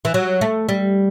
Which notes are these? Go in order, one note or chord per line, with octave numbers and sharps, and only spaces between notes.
E3
F#3
A3
G3